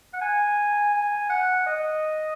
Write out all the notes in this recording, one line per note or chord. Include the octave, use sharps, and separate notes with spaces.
F#5
G#5
G#5
F#5
D#5